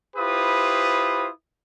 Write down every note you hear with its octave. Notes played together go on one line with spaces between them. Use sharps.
E4 F4 G4 B4 C5 D#6